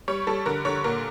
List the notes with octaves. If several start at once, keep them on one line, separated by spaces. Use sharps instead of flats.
G3 C#5
G3 A4
D3 A#4
D3 C#5
A#2 A#4